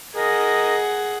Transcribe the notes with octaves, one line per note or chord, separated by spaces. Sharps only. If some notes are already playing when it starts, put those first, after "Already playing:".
G#4 A#4 D#5 F#5